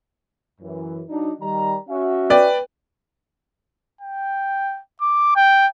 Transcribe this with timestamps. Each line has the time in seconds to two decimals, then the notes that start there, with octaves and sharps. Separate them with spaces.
0.61 F#2 E3
1.09 F#3 D4 D#4
1.41 D#3 G3 A#5
1.89 C#4 F#4 E5
2.30 B4 D5 G5
4.01 G5
5.01 D6
5.36 G5